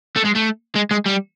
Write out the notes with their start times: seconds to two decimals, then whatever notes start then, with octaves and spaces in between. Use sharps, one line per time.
0.16 A3
0.25 G#3
0.35 A3
0.75 G#3
0.91 G#3
1.06 G3